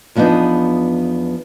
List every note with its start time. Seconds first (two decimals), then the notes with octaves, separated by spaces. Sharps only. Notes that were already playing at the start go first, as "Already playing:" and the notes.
0.15 E2 F3 B3 D4 D#4